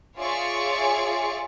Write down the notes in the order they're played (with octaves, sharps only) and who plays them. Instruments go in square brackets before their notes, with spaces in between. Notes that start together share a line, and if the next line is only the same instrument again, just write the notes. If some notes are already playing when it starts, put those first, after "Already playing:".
[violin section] F4 G#4 C#5 D5 E5 C#6